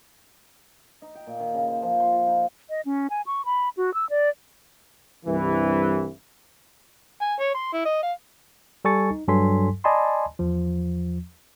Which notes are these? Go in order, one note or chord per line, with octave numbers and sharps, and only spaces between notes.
D#4
G5
A#2
D#3
C#3
C5
F3
C6
F4
D#4
D#5
C#4
G#5
C#6
B5
F#4
E6
D5
C2 G2 E3
G#5
C#5
C6
E4
D#5
F5
G3 A4 G#5 C#6 A6 C#7
D#4
G2 F#3 A4 G#5 C6 B6
D5 D#5 G#5 A5 B5 C6
E2 F3